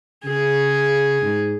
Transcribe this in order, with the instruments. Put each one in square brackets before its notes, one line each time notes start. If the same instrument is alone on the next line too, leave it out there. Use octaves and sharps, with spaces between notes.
[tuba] C#3 [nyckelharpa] G#4
[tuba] G#2